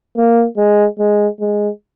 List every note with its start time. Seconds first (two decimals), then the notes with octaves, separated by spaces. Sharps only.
0.16 A#3
0.57 G#3
0.99 G#3
1.40 G#3